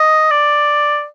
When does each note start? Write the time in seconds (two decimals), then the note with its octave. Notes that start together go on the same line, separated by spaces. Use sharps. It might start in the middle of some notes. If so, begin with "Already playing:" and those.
Already playing: D#5
0.31 D5